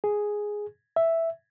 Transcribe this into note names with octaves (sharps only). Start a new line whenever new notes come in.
G#4
E5